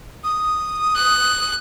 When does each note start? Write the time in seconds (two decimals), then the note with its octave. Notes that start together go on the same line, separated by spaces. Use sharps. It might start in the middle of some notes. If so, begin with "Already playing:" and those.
0.24 D#6
0.96 F#6